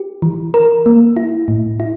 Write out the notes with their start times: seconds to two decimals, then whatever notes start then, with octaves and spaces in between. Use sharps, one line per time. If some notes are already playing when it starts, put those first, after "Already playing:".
Already playing: G4
0.22 E3
0.54 A#4
0.86 A#3
1.17 E4
1.48 A2
1.80 E4